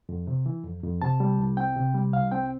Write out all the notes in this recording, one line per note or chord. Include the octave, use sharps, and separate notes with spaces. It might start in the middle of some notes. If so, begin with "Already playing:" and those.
F2
C3
E3
F2
F2
C3 A5
G3
C2
C4 G5
C3
G3
C2 F5
C4 G5